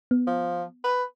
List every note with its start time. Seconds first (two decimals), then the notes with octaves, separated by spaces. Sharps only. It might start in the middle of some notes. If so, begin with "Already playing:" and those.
0.11 B3
0.27 F3
0.84 B4